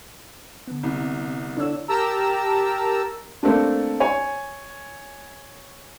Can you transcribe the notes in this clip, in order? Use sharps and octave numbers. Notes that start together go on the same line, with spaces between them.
D3 B3
C2
D3 E4 C#5 D5 E6
G4 A#4 A5 A#5 E6
A3 A#3 C4 D4
C#5 G#5